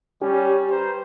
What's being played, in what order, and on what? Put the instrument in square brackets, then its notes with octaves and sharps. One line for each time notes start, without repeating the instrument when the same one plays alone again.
[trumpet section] G3 C#4 [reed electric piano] G4
[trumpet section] B4 C5 A#5